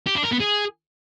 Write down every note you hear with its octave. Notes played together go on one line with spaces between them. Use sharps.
G4
D4
A#4
B3
G#4